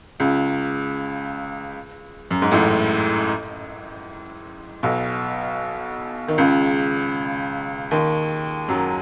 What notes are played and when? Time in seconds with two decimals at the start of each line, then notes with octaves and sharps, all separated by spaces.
0.20 C#2 C#3
2.31 F#2
2.42 G#2
2.51 A1 A2
4.83 B1 B2
6.28 D#3
6.38 C#2 C#3
7.91 D#2 D#3
8.68 F#2 F#3